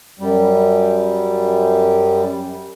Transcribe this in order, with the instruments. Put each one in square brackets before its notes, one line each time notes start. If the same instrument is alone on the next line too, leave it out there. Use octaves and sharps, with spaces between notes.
[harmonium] F#2 G3